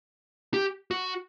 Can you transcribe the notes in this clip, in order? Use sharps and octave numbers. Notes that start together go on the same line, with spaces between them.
G4
F#4